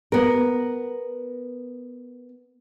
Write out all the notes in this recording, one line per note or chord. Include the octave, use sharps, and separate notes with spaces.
B3 A#4